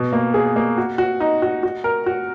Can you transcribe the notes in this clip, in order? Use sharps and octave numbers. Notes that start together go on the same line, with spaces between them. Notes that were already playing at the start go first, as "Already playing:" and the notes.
Already playing: B2
A#3
G#4
A#3
F#4
F#4
D#4
F#4
F#4
A#4
F#4